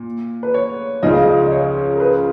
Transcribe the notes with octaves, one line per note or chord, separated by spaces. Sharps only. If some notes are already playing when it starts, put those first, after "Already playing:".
Already playing: A#2
B4
C#5
C#2 C#3 F3 D#5
F5
D#5
D#5
C#5
A#4
B4